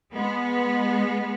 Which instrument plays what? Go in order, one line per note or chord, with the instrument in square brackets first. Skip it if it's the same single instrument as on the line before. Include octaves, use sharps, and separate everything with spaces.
[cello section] G#3 B3